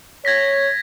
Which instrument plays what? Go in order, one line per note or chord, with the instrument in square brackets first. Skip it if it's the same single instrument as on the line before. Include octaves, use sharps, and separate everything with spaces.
[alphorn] C#5 [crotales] G#6 A#6 B6